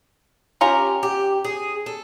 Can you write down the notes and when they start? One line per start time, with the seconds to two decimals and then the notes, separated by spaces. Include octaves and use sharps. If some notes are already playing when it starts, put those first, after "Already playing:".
0.61 C#4 F4 G4 A#4
1.03 G4
1.44 G#4
1.86 A4